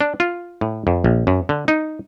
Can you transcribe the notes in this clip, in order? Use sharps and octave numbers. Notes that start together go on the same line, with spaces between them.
D4
F4
A2
F2
A#1
F#2
D3
D#4